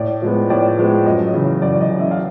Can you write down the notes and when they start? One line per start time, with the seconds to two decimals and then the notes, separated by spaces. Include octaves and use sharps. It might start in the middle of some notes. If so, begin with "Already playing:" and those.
Already playing: A2 D5
0.22 F3 G#3 B3
0.50 A2 D5
0.78 F3 G#3 B3
1.06 F#2 D#5
1.34 C#3 E3
1.62 F#2 D5
1.81 D#5
1.90 C#3 E3
1.99 E5
2.11 F5